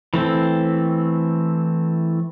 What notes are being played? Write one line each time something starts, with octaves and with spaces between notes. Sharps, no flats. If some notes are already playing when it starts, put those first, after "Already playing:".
E3 A3 C4